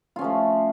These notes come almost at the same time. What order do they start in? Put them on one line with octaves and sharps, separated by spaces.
F4 C#4 F3 A3